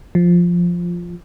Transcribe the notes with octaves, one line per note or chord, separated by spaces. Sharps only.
F3